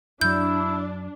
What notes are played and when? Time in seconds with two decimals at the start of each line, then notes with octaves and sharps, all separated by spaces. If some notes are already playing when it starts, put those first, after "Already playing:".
0.21 F#2 F#3 D4 E4 G6